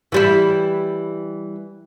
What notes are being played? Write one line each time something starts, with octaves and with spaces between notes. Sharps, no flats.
E3 G3 E4